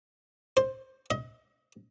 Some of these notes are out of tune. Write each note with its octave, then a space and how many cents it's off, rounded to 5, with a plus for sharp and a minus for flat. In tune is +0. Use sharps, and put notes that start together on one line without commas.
C5 +10
D#5 +30